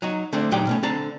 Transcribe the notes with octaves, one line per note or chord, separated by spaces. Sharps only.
F#3 D#4 F#4
D3 A3 C4 D4
C#2 A#2 F#3 D#4 G4 G5
B2 A3 C#4
D3 C4 A5 A#5